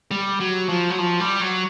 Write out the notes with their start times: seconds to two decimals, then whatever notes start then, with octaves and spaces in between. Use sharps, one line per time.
0.11 G3
0.40 F#3
0.69 F3
0.90 F#3
0.98 F3
1.20 G3
1.41 F#3